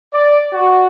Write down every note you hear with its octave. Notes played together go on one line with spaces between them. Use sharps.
D5
F#4